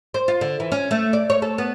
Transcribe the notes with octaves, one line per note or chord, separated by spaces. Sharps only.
C5
F4
D3
E3
C#4
A3
D5
C#5
A4
B3